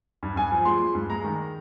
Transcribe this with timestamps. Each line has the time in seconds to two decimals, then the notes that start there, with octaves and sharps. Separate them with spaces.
0.23 G2
0.36 G2 G#5
0.52 F3
0.65 G#3 C6
0.81 G#3
0.95 G2
1.10 G#3 A#5
1.24 D#3